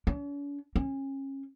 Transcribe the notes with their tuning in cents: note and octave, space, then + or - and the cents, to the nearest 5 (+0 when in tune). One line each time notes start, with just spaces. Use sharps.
C#4 +45
C#4 -30